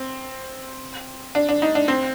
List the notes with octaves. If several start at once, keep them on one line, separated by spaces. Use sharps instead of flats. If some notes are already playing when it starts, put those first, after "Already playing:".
Already playing: C4
D4
D4
D#4
D4
C4